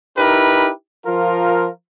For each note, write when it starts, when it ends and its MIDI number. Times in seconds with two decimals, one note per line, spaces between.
0.17 0.70 63
0.17 0.70 64
0.17 0.70 67
0.17 0.70 70
0.17 0.70 71
1.06 1.68 53
1.06 1.68 65
1.06 1.68 70